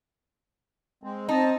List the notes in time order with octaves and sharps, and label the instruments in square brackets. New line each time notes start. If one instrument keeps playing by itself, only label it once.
[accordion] G#3 C4
[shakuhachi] C4 [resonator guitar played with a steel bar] D#4 [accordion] D#5 A5